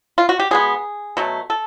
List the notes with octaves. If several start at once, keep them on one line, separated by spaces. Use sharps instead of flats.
F4
F#4
G4
B2 G#3 B3 G#4
B2 F#3 A3
A4